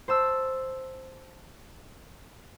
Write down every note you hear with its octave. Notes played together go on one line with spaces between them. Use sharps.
C5 A5 E6